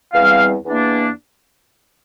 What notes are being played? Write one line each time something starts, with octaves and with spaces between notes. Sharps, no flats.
E2 E3 G3 C4 F5
E2 E3 A#3 D4